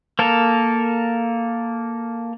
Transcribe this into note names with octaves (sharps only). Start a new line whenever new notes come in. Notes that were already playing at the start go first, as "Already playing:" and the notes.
A#3 A4 A#4